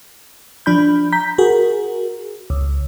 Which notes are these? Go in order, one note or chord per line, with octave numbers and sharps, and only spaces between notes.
F3 D4 B5 G6
A#5 G6 B6
F#4 G#4 A#4
C#2